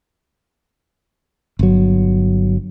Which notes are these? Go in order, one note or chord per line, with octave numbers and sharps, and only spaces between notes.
G1 F#3